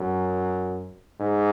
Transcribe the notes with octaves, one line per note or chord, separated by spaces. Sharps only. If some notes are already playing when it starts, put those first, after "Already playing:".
Already playing: F#2
G#2